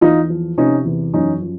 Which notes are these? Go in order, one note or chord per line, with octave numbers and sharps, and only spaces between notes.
E2 D#4 F4
F3
C3 C#4 D#4
E2
F#2 C#4 D#4
F3